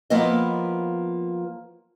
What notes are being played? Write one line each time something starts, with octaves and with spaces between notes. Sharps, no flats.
F3 A#3 B3 E4 D#5